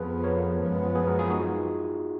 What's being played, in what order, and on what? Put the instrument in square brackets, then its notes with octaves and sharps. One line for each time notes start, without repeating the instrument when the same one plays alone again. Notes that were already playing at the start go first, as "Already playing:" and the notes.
Already playing: [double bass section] F2 F3 B3 [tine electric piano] G#4 B4
[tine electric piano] A#4 C#5
[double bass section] F#2 F3 G#3 B3
[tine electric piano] G#4 B4
F#4 A#4
F4 G#4
D#4 F#4
F4 G#4